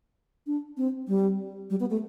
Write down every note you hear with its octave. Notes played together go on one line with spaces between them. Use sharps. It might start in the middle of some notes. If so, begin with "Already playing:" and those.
D4
C4
G3
G3
B3
A3